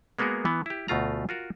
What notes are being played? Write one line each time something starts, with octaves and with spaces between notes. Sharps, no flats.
G#3 A#3 B3 F#4 G#4 A#4
E3 B3
E4 G4
D2 B2 A3 F4 A#5
F4 F#4 A#4